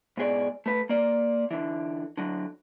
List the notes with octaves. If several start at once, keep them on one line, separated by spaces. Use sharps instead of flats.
G#2 B2 G#4 C5 D5
A3 B4
A#3 D5
D3 E3
D3 F#3